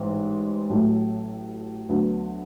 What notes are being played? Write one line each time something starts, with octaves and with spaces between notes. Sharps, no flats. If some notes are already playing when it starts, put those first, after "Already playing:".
Already playing: A1 G#2 E3 G#3
A1 A2 F#3 A3
D2 D3 F#3 B3